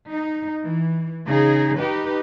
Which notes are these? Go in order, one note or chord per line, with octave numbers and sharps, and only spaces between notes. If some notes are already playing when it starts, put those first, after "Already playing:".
D#4
E3
C#3 D#4 G#4
D#4 G4 B4